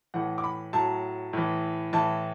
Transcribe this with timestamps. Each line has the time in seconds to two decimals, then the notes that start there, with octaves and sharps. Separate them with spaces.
0.14 A2 E3 F#5
0.38 D6
0.44 B5
0.73 A2 F#3 A5
1.33 A2 E3
1.93 A2 E3 A5